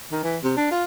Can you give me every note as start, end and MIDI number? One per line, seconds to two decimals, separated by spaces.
0.12 0.20 51
0.23 0.38 52
0.43 0.53 48
0.57 0.69 62
0.71 0.84 65